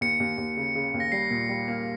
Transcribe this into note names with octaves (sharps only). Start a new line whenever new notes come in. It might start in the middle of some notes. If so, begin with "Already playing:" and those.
D#2 C#7
D#2
D#2
C#3
C#3
D#2
A#6
G3 C7
A#2
G3
A#3